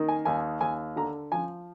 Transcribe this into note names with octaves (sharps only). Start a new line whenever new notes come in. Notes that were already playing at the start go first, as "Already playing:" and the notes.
Already playing: D#3 A#3
G#5
D#2 G#5
D#2 G#5
D3 A#5
F3 G#5